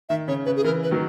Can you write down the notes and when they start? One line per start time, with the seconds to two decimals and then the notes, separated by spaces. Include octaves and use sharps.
0.09 D#3 E5
0.28 C#3 C#5
0.45 C#3 B4
0.56 G#4
0.64 C#3 E3 A#4
0.83 B4
0.91 D#3 F#3